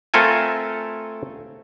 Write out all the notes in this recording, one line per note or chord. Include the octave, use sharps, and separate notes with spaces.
A3 C4 F4 A4 A#4 G#5